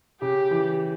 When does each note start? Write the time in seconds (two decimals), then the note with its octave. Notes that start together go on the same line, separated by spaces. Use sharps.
0.21 C#3 G4
0.51 E3